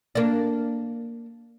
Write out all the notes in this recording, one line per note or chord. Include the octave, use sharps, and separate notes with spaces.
A#3 D4